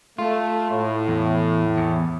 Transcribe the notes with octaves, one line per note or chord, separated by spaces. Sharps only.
A3 F4
A2
E2
E2